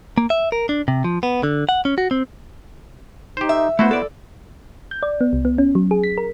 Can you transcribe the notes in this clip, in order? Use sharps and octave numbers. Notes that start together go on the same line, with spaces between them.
A#3
E5
A#4
D4
C3
F3
B3
D3
F#5
C#4
F#4
C4
D#4 G4 C5
E5
A3 B3 E4 F#4 C5
A4 D5
G6
D5
B3
C2
B3
C#4
F#3
G#4
B6
A#4